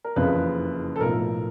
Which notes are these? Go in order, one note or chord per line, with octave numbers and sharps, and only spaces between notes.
A#4
F#1 F2 C#3 E3 B4
A4
B1 A2 F3 A#4